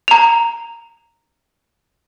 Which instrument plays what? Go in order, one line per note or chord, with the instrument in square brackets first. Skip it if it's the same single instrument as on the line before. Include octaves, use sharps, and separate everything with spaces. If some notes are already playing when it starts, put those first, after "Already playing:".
[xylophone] A#5 F7